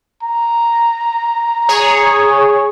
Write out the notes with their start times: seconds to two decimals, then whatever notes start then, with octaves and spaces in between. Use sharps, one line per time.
0.23 A#5
1.69 G#4 C#5